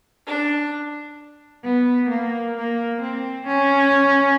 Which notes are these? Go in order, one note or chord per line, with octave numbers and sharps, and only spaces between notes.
D4
B3
A#3
A#3
C4
C#4